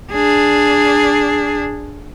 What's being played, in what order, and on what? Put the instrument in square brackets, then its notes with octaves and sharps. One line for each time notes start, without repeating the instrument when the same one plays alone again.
[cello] D4 G#4